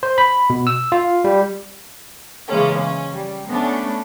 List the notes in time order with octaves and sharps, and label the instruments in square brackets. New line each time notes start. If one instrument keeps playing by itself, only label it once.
[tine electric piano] C5
B5
B2
E6
F4
G3
[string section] C#3 E3 G#3 A#3 C#4
C#4
G3
A3 B3 C#4 D4